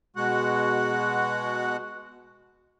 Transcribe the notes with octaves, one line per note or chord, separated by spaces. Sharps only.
B2 G#3 F#4 F#5